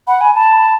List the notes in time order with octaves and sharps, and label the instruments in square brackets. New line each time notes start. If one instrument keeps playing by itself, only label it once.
[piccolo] F#5 [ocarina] B5
[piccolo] G#5
[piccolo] A5 [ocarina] B5
[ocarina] B5